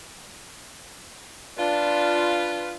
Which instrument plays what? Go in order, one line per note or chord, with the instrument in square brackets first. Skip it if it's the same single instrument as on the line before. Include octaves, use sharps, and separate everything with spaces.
[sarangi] D4 [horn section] F4 B4